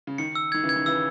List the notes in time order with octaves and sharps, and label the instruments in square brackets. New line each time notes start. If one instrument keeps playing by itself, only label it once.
[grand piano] C#3
[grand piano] D#3 [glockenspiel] C#7
[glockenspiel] E6
[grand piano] D#3 [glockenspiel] G#6
[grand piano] C#3 E3
[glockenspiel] G#6
[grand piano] D#3
[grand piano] C#3 E3 [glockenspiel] E6